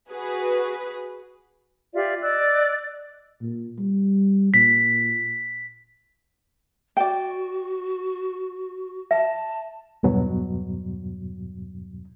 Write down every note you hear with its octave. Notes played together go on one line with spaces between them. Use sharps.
F#4 G#4 B4
F4 G4 D5 E5
D5 D#5 E6 F#6
A#2
G3
A#2 B6
F#4 D5 G5
E5 A5
E2 G2 B2 F#3